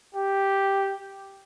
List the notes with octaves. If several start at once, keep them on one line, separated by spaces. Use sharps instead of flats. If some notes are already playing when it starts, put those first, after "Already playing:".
G4